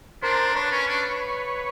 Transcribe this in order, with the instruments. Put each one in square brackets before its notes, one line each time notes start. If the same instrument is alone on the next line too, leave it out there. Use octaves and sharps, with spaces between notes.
[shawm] D4 [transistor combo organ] A#4 C5
[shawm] D4 [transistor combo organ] B4 C#5
[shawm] C#4
D4